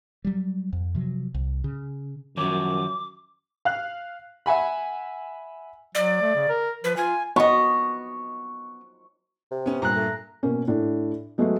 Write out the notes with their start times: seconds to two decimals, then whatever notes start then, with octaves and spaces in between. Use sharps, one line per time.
0.25 F#3 G3
0.73 F2
0.95 C3 F3 F#3
1.34 C2
1.64 C#3
2.37 F#2 D#3 F3 C#5 D6
3.65 F5 F#6
4.46 E5 F#5 G#5 B5
5.95 F#3 D5
6.21 A3
6.35 C#3
6.49 A#4
6.84 F3 B4
6.97 F4 G#5
7.36 B3 D#5 C#6
9.51 C3
9.66 B3 C#4
9.82 G2 A#2 A#5 F#6
9.95 A3
10.43 B2 A#3 C#4
10.68 A2 D4
11.38 F#3 G#3 A3 B3 F#4 G#4